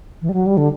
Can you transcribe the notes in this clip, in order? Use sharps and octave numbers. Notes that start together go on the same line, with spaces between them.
E3
G3
F#3
G3
D3